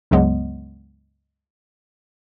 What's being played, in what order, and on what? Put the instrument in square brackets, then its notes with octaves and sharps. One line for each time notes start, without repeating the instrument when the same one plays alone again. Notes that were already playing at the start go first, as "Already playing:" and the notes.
[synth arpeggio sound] C#2 G2 C#3 F#3 G#3 B3